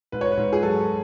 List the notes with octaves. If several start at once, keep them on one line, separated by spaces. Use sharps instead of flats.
G#2 B4
C#5
B4
G#2
G#4
F#3 A4